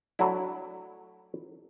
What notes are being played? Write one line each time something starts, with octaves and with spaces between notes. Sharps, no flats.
F#3 A3 D4 E4